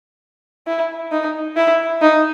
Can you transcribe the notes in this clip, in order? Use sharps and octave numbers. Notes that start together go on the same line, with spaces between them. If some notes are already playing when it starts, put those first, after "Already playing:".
E4
D#4
E4
D#4